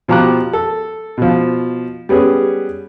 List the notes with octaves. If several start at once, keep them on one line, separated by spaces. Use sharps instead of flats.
B2 F3 G4 A#5 D6 F#6
A4
B2 F3
G3 B3 C#4 G#4